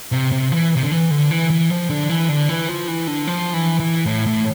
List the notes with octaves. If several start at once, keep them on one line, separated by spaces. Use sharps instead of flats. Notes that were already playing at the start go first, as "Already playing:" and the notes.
C3
C3
E3
C3
D3
E3
D3
E3
E3
F3
D3
E3
D3
E3
F3
E3
D3
F3
E3
E3
A2
A2